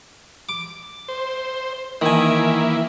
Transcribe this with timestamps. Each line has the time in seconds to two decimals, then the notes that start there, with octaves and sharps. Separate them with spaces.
0.49 D6
1.08 C5
2.01 D#3 E3 A#3 E4 G#5